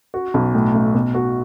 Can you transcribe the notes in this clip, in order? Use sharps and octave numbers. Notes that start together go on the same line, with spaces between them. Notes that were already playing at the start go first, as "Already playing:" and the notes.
F#4
B1
A2
A3
B2
F#4